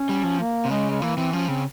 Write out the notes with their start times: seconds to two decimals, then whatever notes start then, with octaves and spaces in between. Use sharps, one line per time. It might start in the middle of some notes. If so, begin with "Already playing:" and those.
Already playing: C#4
0.09 G3
0.23 F3
0.40 A#3
0.65 C3
0.70 C#3 G#3
0.90 G#3
1.01 E3 A#3
1.17 E3 C4
1.33 F3 C#4
1.48 C#3 C4